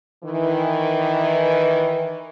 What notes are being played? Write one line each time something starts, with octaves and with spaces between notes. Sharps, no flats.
D#3 E3